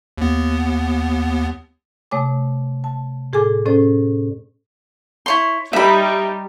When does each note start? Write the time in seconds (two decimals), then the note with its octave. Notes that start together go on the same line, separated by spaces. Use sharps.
0.18 D#2 B3
2.11 C3 A3 C#5 G#5 D6
2.84 A5
3.33 A2 G#4 A4 G#5 D6
3.65 A2 C#4 A4 C5 D5
5.26 E4 C#5 C6
5.73 G3 D#4 E5 B5